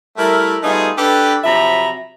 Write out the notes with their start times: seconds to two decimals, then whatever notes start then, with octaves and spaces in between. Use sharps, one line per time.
0.17 G3 A3 E4 A#4
0.62 G3 A3 B3 D#4 F4 G#4
0.98 D4 G4 A4 B4
1.44 C3 F3 F#3 E5 A#5 B5